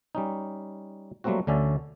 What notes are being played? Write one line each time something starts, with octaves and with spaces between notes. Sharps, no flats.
G3 C#4 D#4
F#3 G3 A3 A#3 C4 F#4
D2 D3 C#4 D5 E5